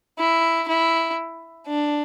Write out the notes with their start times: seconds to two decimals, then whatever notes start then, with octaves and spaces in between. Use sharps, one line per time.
0.19 E4
0.68 E4
1.67 D4